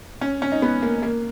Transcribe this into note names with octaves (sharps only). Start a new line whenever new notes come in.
C#4
C#4
D#4
B3
A#3
A#3